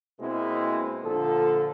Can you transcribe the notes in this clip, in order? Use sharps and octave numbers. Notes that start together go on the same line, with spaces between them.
B2 G#3 A#3 C4 E4
A#2 D3 F3 A4